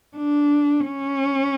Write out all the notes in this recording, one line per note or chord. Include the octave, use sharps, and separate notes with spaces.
D4
C#4